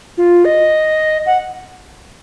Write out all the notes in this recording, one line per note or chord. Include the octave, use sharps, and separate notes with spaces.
F4
D#5
F#5